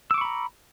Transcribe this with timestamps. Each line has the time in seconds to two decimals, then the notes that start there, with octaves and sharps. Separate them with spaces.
0.11 E6
0.14 D6
0.18 C#6
0.21 B5
0.25 A#5